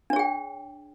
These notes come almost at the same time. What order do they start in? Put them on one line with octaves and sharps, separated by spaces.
D4 C#5 G#4 G5